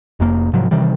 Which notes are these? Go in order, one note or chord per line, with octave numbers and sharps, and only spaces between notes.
F1 F2 A#3
G#2 C3 F3 F#3
C3 D#3 E3 G3